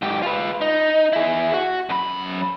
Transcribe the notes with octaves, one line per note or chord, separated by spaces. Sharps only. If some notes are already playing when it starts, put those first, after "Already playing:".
G#2 G4
F4 B4
D#4
E4 G#4
F#4
F#2 B5